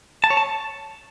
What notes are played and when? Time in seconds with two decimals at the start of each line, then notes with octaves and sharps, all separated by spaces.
0.24 A5
0.30 C#5
0.37 A5